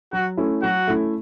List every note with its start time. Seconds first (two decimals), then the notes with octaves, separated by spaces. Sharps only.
0.13 F#3 F#4
0.37 A3 C#4 E4
0.63 F#3 F#4
0.87 A3 C#4 E4